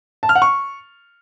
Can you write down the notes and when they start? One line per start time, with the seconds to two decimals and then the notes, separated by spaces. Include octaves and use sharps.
0.23 A5
0.29 F6
0.35 F#5
0.42 C#6